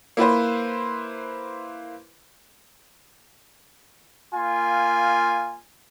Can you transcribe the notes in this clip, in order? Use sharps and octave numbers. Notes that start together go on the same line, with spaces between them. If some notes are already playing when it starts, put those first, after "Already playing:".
A#3 E4 B4 C5
A#3 F4 G#5